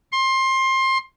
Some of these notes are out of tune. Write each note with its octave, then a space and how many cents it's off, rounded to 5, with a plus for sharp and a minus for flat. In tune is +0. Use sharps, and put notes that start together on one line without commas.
C6 +20